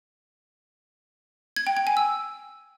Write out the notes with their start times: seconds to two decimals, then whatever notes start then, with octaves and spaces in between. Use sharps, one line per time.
1.56 G#6
1.67 G5
1.77 G5
1.87 G#5
1.97 E6